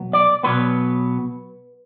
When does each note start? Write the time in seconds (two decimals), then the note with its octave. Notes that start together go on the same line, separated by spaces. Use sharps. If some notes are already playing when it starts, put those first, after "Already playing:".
Already playing: B1 F#3 B3
0.13 D5
0.43 B1 B2 F#3 B3 B4